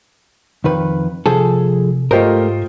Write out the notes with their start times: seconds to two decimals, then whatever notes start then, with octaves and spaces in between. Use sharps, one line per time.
0.64 F2 D#3 B4
1.26 C3 F3 G#4 A4
2.11 G#2 A3 F4 G4 A#4 C5 D#5